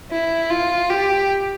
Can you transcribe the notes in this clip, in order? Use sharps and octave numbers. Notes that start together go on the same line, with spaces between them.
E4
F4
G4